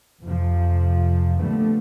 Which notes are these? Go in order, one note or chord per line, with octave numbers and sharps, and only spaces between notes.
F2 C3 F3
A#2 D3 F3 G3 A3 B3